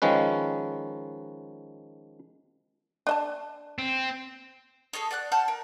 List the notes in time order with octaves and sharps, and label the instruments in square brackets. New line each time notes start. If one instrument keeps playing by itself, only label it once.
[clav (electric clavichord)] D#3 F3 G#3 C#4 B4
[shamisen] D4 D#5 A5
[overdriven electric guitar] C4
[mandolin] G#4 A4 C#5 D#5
D5 F#5 C#6 F#6
F#5 A5 F6 G6
A#4